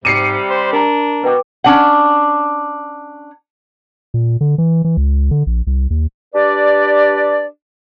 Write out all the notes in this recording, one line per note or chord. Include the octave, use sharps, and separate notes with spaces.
G#2 C3 G3 D6 C7 C#7 D#7
C5 C6
D4 A#4 A#5
B2 B4 G5 D6
C#4 D4 F#5
A#2
D3
E3
E3
C#2
D3
A#1
C2
D#2
D4 G4 B4 D5